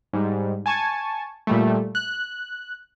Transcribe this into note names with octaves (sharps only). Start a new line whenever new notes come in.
G#2 G3
G#5 A5 C#6 G#6
A#2 G3 A3
F#6